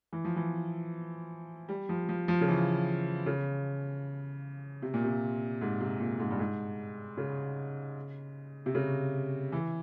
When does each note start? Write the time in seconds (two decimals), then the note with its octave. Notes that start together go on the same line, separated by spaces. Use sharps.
0.13 E3
0.24 F3
0.36 E3
1.69 G3
1.89 F3
2.09 F3
2.28 F3
2.41 C#3
2.48 E3
3.26 C#3
4.82 C3
4.94 A#2
5.04 C3
5.61 G#2
5.80 C3
6.00 A#2
6.19 G#2
6.31 G2
6.39 G#2
7.17 C#3
8.66 C3
8.75 C#3
9.52 E3